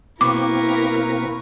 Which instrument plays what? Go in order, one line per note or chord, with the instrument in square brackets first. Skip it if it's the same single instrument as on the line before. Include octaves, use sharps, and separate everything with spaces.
[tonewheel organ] B2 A#3 C4 [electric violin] E4 A#4 [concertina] B4 C#6 [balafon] D6